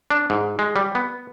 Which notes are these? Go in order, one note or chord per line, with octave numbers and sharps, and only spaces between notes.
D4
G#2
G#3
G3
B3